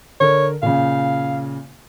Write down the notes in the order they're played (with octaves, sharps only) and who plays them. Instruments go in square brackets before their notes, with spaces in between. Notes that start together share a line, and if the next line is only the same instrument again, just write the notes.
[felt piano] D3 A#4 [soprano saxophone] C#5
[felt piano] A#2 C#3 [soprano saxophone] F5